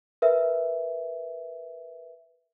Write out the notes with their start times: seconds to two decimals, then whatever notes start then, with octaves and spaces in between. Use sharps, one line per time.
0.22 A#4 B4 E5